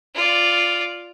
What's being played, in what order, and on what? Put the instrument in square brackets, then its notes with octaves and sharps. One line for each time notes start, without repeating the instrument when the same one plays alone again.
[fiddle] F4 D5